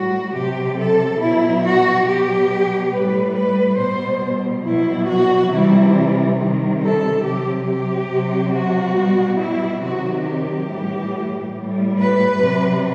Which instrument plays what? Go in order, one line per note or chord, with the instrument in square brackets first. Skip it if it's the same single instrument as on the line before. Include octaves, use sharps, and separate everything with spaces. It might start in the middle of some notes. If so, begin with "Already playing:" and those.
Already playing: [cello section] A2 G3 F#4
C3 F#3 G4
A4
B2 F#3 E4
F#4
B2 F#3 G4
A2 G3 B4
B4
B2 G3 C5
B2 F#3 E4
F#4
C3 E3 G3 E4
C3 D#3 G3
A4
C3 F#3 G4
G4
C3 F#3
F#4
B2 G3
E4
C3 D#3 F#3 F#4
G4
A2 E3 G3
A2 G3
B4
C3 F#3